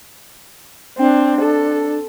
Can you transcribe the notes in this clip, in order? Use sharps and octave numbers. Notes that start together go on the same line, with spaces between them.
C4 D4
A4